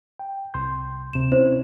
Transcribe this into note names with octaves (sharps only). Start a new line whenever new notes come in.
G5
C2 C6 G6
D2 C3 E7
C4 C#4 E4 C5